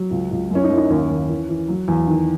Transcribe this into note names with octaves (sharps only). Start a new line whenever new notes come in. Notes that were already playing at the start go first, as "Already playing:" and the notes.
Already playing: F#3
C#2
C#2
F#2 C#4
D#4
F#2 E4
D#4
D#2 C#4
D#2
E3
E3
F#3
E2
D#3